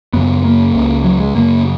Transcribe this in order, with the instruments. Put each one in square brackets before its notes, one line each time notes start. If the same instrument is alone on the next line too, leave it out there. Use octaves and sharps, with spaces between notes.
[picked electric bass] F#2 C#3 B3
A#3
C#2 C#3
F#3
G#3
F#2 C#3 A#3